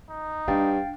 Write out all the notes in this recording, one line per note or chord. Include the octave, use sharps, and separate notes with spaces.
D#4
G2 D4 F5 G5 A6